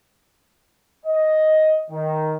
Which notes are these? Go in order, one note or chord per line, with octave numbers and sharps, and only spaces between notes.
D#5
D#3